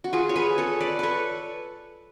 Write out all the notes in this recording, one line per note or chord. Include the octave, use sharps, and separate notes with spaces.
F#4
F4 G#4
C#5
G#4 B4
A4 C#5
B4 D5
A4 B4 C#5